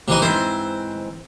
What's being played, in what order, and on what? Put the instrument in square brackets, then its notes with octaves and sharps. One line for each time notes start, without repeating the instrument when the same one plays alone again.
[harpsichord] C3 E3 D#4
[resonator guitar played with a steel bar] G#2 E3 C4 [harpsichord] C5